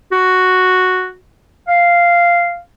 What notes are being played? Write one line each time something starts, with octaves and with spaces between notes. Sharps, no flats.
F#4
F5